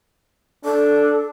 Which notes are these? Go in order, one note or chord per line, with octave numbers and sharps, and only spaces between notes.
D4 A4